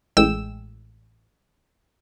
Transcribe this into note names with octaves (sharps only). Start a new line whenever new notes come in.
A1 G#3 G5 E6